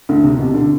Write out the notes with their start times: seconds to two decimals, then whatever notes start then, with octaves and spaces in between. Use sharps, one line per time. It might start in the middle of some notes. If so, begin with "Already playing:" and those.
0.09 D2 D3
0.24 C3
0.38 B2
0.54 D3